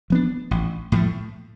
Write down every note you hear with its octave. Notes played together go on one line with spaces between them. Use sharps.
F3 B3 D4
A1
A2 F3 A3